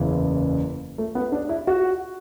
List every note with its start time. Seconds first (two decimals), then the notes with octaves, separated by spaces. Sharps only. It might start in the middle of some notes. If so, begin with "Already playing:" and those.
Already playing: F#1 E2 C#3 E3
0.98 A3
1.15 B3
1.32 D4
1.49 E4
1.67 F#4